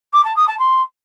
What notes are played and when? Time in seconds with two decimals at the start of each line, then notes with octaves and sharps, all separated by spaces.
0.13 D6
0.24 A5
0.36 D#6
0.47 A5
0.59 C6